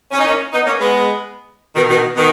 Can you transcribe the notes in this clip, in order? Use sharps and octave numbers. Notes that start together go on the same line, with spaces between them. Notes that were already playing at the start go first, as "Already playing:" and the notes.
C#4
D#4
A#3 C#4
B3 D#4
A#3 C#4
G#3 B3
B2 D#3
B2 D#3
B2 D#3